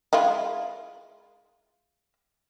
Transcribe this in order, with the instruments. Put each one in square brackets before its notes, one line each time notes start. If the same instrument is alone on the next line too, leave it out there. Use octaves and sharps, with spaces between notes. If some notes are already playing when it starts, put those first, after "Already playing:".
[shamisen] G#3 E4 F4